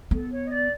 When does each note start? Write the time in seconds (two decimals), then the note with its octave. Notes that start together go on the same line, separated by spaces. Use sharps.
0.11 B3 A4
0.31 C#5
0.43 D#5
0.50 D5